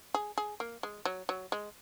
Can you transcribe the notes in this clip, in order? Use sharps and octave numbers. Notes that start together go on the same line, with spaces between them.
G#4
G#4
A#3
G#3
F#3
F#3
G#3